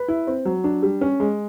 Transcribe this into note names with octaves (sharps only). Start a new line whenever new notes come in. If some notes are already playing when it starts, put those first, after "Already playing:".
Already playing: B4
E4
C4
F#3
D4
G3
C#4
G#3